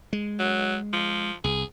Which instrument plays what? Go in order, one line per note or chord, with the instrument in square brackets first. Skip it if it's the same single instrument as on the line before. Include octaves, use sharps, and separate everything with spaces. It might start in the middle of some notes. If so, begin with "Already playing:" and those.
[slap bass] G#3
[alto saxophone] F#3
F3
[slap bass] C2 [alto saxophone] G#4